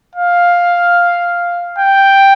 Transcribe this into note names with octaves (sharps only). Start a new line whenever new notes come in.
F5
G5